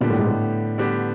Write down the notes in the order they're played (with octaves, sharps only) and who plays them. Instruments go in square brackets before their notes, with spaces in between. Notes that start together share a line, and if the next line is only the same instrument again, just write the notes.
[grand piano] A#2 [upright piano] D3 G3 B3 D4 G4
[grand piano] A2
G#2
A2
[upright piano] D3 G3 B3 D4 G4